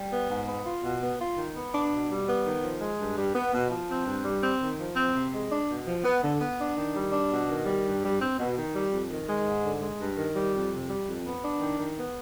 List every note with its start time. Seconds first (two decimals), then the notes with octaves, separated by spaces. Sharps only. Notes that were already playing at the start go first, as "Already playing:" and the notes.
Already playing: G3
0.12 B3
0.30 G#2
0.47 B3
0.66 F4
0.84 B2
1.01 B3
1.20 F4
1.38 D#3
1.55 B3
1.73 D4
1.91 B2
2.10 G3
2.27 B3
2.45 D#3
2.63 F3
2.81 G#3
3.00 G2
3.18 G3
3.35 B3
3.54 B2
3.71 F3
3.90 C4
4.07 G2
4.25 G3
4.43 C4
4.61 D#3
4.79 F3
4.97 C4
5.15 C3
5.33 G#3
5.51 D4
5.69 B2
5.86 F3
6.04 B3
6.23 D3
6.40 B3
6.59 D4
6.77 D#3
6.94 G3
7.12 D4
7.31 B2
7.48 D#3
7.66 G3
7.84 G2
8.03 G3
8.20 C4
8.39 B2
8.57 D#3
8.74 G3
8.91 F2
9.11 D#3
9.29 G#3
9.46 G#2
9.63 D3
9.82 G#3
10.00 G2
10.18 D#3
10.35 G3
10.54 F2
10.72 C3
10.89 G3
11.08 F2
11.25 B3
11.44 D4
11.61 D#3
11.79 D#3
11.98 B3